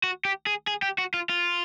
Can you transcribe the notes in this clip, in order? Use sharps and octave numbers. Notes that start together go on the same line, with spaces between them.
F#4
G4
G#4
G#4
G4
F#4
F4
F4